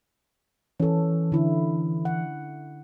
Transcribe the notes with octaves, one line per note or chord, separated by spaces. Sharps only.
E3 C#4 A4
D3 E4
F#5